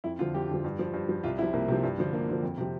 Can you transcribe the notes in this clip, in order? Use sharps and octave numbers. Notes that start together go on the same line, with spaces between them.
F2 E4
D3 F3 F4
F2 G4
D3 F3
G2
F3
G2
F3
C2 F4
C3 F3 E4
C2 A#3
C3 F3
G2
D3 F3
G2 A#3
D3 F3
F2
C3 F3